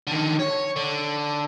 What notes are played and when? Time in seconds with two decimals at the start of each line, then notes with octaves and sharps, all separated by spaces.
0.07 D3 D#3
0.40 C#5
0.76 D3